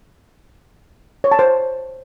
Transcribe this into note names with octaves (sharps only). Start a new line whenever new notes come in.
C#5
A5
C5